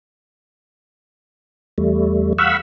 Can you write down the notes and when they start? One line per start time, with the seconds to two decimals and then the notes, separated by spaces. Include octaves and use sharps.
1.78 E2 G3 A3
2.38 F5 F#5 B5 C#6 E6